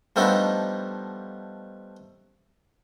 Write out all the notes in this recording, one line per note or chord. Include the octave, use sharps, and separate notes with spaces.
F3 G3 A3 B3 D4 D#4